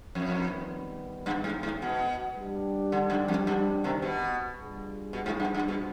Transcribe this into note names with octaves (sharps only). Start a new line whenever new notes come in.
F2 D#3 G3 B3
G2
G#2
G#2
B2
G3 D4 G4
D3
G2
F2
G2
C3 D#3
B2
G3 D4 F4 G#4
B2
G#2
G2
G2
B2